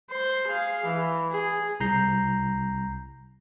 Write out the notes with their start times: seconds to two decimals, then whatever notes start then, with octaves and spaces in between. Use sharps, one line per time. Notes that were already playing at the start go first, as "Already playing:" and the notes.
0.11 C5
0.47 G#4 F5
0.85 E3
1.31 G#4
1.80 C2 A#5 G6 C7